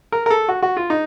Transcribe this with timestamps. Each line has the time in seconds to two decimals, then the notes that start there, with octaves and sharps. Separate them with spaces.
0.12 A#4
0.26 A#4
0.30 A4
0.49 F#4
0.62 F#4
0.77 F4
0.90 D#4